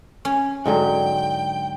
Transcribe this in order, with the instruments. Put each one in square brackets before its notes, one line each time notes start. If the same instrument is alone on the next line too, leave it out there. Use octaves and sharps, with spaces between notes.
[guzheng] C#4
[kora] G#2 D3 F#3 [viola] G5